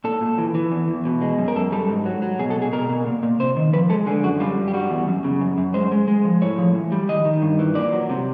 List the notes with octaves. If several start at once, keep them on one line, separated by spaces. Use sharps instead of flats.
A#2 A4
A#2
E3
E3
E2
E2
B2
G#3
F#2
A#4
F#2 A4
G3 A4
G#2
F#3
F#3
B2 G#4
A4
B2
G#4
B2 A#4
B2
A#2
A#2
C3 C5
D#3
F3 B4
G#3 A4
D3 G#4
F#2 F#4
G3 F4
G2
G4
G3 F#4
E2
F#2
C#3
F#2
F#2
G#3 C5
G#3
G#3
F3
A2 C#5
F3
E3
G3
D#3 D#5
D#3
G2
E3
A#2 D5
F#3
C3